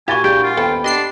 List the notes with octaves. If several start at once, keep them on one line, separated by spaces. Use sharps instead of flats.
A#2 E4 F#4 G4 G#5 A6 G7
G#3 D4 G4 G5
F4
D#1 B3 A4 G5
D4 G4 D#5 C6 C7